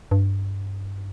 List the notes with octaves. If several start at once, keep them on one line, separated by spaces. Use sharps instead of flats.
G2